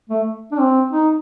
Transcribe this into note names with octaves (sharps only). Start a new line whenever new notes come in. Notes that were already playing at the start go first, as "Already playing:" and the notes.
A3
D4
C4
D#4